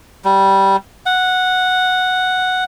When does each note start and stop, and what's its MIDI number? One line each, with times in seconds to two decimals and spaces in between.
0.25 0.76 55
1.06 2.64 78